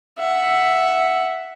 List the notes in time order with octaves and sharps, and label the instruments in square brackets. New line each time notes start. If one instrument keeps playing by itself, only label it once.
[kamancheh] E5 F#5